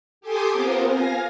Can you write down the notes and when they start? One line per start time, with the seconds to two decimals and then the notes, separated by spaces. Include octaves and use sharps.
0.21 G4 A4 G#5 C6 D6 D#6
0.51 B3 C4 F4 A#4 C5
0.87 F5 G#5 A#6